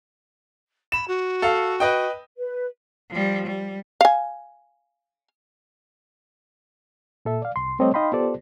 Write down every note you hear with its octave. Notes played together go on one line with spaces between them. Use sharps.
B5 E7
F#4
A4 F5
B4 D#5 G5
B4
F3 G3
G3
F5 G#5
A#2 A4 E5
D5 F5
C2 C6
G3 A3 C4 A4 C#5 D#5
D#4 D#5 F5 G5 B5 C6
B3 F4 G4 A4 C5 D5